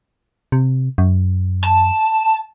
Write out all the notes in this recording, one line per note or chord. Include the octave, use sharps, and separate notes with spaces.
C3
F#2
A5